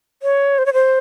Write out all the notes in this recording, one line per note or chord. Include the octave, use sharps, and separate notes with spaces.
C#5
C5
C#5
C5